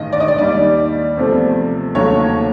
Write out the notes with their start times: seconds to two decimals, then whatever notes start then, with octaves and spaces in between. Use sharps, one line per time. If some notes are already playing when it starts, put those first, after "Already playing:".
Already playing: A1 G2 D#3 G#3 D#5
0.13 D5
0.20 D#5
0.28 D5
0.38 D#2 D#3 G3 D5
1.16 E2 C3 F3 A3
1.95 D#2 C#3 F#3 A3 C#5